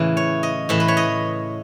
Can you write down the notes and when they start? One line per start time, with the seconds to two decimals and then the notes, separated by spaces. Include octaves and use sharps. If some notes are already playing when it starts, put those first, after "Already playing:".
Already playing: A2 C#3 E3 E4
0.17 C#5
0.43 D#5
0.69 A2 E3 E5
0.80 B4
0.88 C#5
0.97 D#5